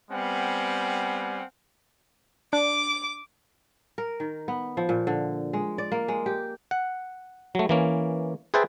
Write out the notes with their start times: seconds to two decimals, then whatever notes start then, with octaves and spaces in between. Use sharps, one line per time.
0.10 G3 B3 C4 F5 F#5 G#5
2.53 D4 D6
3.98 A#4
4.20 D#3
4.48 B3
4.77 F3
4.89 A#2
5.07 D3
5.53 G#3
5.78 D5
5.92 A#3
6.08 G#3
6.26 G4
6.71 F#5
7.55 F#3 A3
7.69 E3 A#3 C#4
8.54 G#4 B4 C5 E5 G5 A5